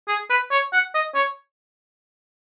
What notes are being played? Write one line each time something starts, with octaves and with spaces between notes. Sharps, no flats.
G#4
B4
C#5
F#5
D#5
C#5